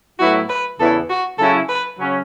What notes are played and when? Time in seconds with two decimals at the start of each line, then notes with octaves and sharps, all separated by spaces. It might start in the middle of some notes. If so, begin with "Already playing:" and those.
0.19 A2 F#3 B3 E4 F#4
0.49 B4
0.79 E2 C#3 E3 B3 E4 A4
1.10 F#4
1.38 C#3 F#3 C#4 E4 A4
1.69 B4
1.98 C#3 F#3 C#4